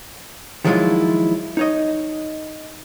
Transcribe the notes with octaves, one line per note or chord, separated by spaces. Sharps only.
D#3 F3 F#3 G#3 E4 F4
D#4 C#5 D#5